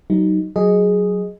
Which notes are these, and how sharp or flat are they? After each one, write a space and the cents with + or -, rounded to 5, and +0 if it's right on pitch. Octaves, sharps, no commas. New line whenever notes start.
F#3 +30 D#4 +0
F#3 +0 G#4 +0 D#5 +0